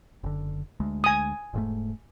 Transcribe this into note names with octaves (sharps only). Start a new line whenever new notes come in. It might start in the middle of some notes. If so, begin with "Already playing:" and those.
F#1 D3
D2 G#3
G#5 D#6
E1 G#2 A3